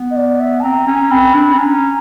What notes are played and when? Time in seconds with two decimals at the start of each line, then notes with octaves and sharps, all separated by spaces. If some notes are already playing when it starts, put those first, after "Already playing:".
Already playing: B3
0.11 D#5
0.16 D5
0.40 E5
0.60 A5
0.63 C4 A#5
0.87 C#4
1.11 C4 B5
1.34 D4
1.53 C4
1.57 C#4 A#5